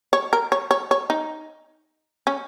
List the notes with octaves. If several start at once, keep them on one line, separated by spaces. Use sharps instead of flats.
C#5
A#4
C#5
C#5
C#5
D#4
C#4